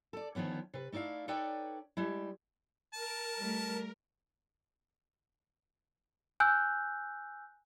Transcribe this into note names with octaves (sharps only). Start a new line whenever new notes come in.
A4 D5
D2 D#3 F3 B3 C#4
C3 B4
A3 D#4 E4 D5 F5
D#4 A4 B4 C#5 D5 G5
G3 G#3 E4
A#4 A5
G3 A3
G#5 E6 F#6 G6